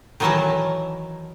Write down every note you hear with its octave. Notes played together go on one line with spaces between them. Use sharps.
D#3 E3 F#3 A#4 E5 A5